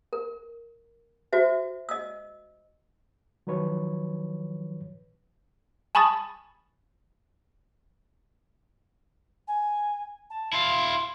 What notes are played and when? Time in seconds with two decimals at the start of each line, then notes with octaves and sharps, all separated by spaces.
0.13 A#4
1.33 F#4 C5 E5
1.89 D#5 E6
3.47 D#3 F3 F#3 B4 C#5
5.95 G#5 A5 B5 C#6 D#6 A6
9.47 G#5
10.30 A5
10.53 E4 F5 C6